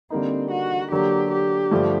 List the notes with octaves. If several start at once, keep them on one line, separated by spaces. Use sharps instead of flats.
D3 G3 A#3 C4 D#4
F#4
D3 F#3 A#3 G4
G4
G2 D3 F3 A3